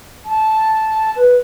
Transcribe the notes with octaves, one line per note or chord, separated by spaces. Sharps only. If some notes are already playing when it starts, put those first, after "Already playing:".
A5
B4